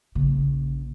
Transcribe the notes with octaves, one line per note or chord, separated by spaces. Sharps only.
A#1 C#3